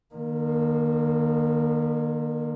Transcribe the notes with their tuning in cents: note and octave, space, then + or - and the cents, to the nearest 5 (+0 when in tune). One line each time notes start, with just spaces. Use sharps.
D#3 -40 A#3 +20